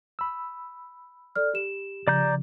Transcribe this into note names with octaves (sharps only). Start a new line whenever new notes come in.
B5 E6
A4 D5 F6
G4 E7
C#3 F3 D5 A#5 G6